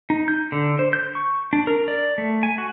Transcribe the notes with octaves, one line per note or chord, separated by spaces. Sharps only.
D#4
G6
D3
C5
G6
C#6
D4
A#4
D5
A3
G#5
F#4